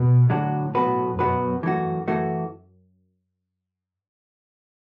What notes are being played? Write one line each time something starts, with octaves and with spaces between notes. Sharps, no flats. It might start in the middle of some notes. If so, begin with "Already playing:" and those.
Already playing: B2
A2 D3 F#3 D4 F#4
B2 F#3 B3 F#4 B4
F#2 B2 F#3 B3 F#4 B4
E3 A3 F#4
E3 A3 F#4